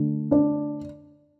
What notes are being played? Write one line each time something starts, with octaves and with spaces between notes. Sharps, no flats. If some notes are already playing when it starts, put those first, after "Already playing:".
Already playing: D3 A3 D4
D4 D5